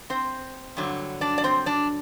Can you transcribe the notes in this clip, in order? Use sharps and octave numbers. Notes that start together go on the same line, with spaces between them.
C4 C5
G2 D3 F#3
D4 D5
D5
C4 C5
D4 D5